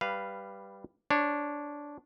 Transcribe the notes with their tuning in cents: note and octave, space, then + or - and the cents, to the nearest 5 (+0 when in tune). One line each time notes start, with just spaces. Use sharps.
G3 +0 B4 +0 F5 -15
D4 -10 C#5 -20